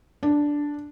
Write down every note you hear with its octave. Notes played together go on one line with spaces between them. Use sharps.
D4